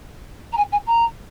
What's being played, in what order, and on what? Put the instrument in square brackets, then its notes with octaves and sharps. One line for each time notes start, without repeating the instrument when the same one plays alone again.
[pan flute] A#5
G#5
G#5
A#5